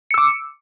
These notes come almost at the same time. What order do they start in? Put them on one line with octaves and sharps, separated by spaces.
C#7 E6 D6